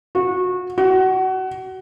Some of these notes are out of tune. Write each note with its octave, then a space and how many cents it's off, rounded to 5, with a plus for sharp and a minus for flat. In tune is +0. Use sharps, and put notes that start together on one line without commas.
F#4 -25
F#4 +25